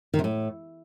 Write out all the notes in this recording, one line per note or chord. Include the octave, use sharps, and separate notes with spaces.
D#3
C3
A2